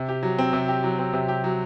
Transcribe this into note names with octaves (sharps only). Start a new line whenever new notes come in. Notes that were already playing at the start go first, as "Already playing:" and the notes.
Already playing: C3
G4
F#3
C4
C3
G4
F#3
C4
C3
G4
F#3